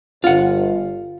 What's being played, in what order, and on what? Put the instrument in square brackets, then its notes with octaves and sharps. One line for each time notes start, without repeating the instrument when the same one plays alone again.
[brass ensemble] G1 [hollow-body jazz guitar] F4 F#5